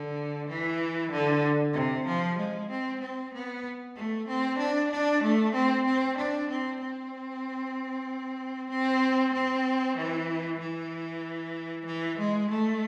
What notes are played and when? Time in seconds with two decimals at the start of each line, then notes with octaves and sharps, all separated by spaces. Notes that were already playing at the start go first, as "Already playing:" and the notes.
Already playing: D3
0.47 E3
1.11 D3
1.73 C3
2.06 F3
2.37 G#3
2.69 C4
3.00 C4
3.32 B3
3.95 A3
4.27 C4
4.59 D4
4.90 D4
5.22 A3
5.54 C4
5.85 C4
6.17 D4
6.49 C4
6.79 C4
8.70 C4
9.32 C4
9.96 E3
10.59 E3
11.85 E3
12.17 G#3
12.49 A3